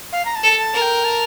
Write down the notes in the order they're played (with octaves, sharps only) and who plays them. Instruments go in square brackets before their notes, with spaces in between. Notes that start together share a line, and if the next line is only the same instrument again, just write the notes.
[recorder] F5
A#5
A5
[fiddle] A4
[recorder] A5
[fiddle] A#4
[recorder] G5
A5